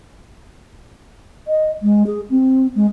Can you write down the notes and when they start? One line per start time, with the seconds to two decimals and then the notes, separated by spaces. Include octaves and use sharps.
1.48 D#5
1.82 G#3
2.06 G#4
2.30 C4
2.75 G#3